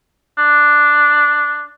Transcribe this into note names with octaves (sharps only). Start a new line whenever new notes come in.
D4